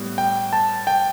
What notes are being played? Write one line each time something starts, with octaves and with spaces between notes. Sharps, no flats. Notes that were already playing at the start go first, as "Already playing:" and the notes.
Already playing: A2 G3 B3
G5
A5
G5